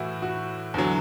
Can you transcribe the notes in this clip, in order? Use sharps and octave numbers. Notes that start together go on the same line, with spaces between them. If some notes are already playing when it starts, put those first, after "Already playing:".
Already playing: A2 E3 E4 F#4
F#4
E2 D3 F#3